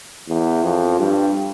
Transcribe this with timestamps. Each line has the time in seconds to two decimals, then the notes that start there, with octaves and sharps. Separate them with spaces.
0.28 E2
0.63 F2
0.99 G2